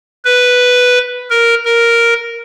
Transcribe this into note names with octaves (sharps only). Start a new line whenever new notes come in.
B4
A#4
A#4